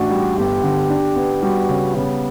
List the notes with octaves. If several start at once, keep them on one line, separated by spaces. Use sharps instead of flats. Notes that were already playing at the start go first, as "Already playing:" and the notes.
Already playing: A1 D4 F#4
G3
G1 G4
D3
D4
B3
G3 F#4
C#3
C#3 B3